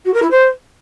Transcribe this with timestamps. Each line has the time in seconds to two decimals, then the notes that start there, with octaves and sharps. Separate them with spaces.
0.05 F#4
0.14 A#4
0.22 E4
0.31 C5